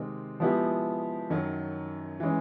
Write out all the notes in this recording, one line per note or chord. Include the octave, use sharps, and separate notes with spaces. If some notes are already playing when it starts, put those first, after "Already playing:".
Already playing: C3 D#3 G#3 C4
F3 G#3 B3 E4 G4
F#2 D#3 F#3
E3 G#3 C#4